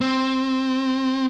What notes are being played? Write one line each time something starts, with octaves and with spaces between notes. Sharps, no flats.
C4